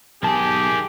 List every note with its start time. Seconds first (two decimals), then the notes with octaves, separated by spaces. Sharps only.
0.23 B1 D#3 G4 G#4 A5